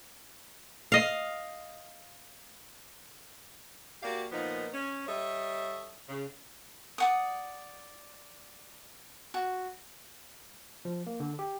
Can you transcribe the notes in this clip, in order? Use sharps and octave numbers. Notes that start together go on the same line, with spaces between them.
D#5 F5
A#3 F#4 G4 D5 F5
A#2 D#3 F3 B3 D#4
C#4
G3 A4 C#5 D#5 E5
C#3
D5 F#5 D#6
F#4
F3
A#3
D3
G4